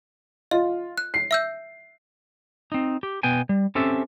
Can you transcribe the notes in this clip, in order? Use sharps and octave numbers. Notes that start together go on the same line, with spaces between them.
F4 D#5
F#6
C7
E5 E6 G6
C4 D#4
G4
B2 B3 G5 G#5
G3
C4 C#4 G4 A4 E5